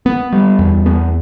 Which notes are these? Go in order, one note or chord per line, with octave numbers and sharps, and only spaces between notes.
B3
G3
E2
B3